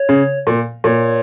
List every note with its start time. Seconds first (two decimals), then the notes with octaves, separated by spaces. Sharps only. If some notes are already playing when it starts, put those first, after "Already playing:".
Already playing: C#5
0.09 C#3
0.47 A#2
0.84 A#2 C#5